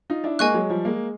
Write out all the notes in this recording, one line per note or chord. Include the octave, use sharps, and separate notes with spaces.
D#4 F4
D4 E4
G#3 A#3 D#5 G#5 C#6 F#6
F#3 G#3
F3 G3
G#3 A#3